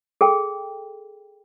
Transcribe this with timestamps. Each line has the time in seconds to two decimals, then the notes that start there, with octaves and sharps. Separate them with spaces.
0.21 G#4 A4 G5